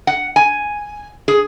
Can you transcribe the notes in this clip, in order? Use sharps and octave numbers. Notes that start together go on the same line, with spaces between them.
F#5
G#5
G#4